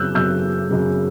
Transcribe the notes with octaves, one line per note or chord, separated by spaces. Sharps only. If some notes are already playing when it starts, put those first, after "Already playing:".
Already playing: F#2 C#3 F#3 E6 F#6 G6
F#2 C#3 F#3 E6 G6
F#2 C#3 F#3